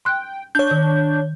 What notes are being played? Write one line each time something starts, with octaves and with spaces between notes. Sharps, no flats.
G5 C6 F#6
D4 C#5 G6
D#3